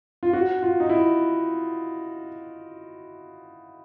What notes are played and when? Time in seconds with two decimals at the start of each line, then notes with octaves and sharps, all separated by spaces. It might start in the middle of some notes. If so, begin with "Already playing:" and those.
0.23 F4
0.33 F#4
0.62 F4
0.80 D#4
0.89 E4